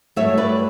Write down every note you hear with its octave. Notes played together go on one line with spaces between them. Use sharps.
G2 F#3 A3 C#5 E5
B4 D5